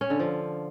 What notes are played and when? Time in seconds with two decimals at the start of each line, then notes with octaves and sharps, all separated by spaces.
0.01 C#4
0.10 D3
0.19 F3